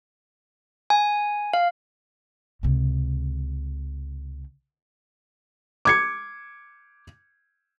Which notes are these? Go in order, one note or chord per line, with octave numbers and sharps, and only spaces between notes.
G#5
F5
C#2 C3
D6 G#6 C#7